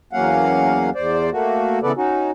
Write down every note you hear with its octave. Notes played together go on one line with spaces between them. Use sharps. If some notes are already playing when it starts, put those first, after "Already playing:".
E2 F#3 A#3 C#4 F5 F#5
E2 C5 D5
A3 A#3 F#4
C#3 E3 B3 A4 B4 D5
C#4 D#4 F#4